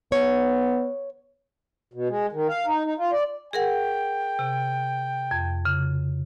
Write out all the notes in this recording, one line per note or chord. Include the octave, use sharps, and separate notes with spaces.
B3 C#5
B2
G#3
D#3
F5
D#4
D#4
F4
D5
G#4 A#4 F#5 G5
C3
F2
C#3